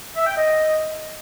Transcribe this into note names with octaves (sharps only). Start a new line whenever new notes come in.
E5
G5
D#5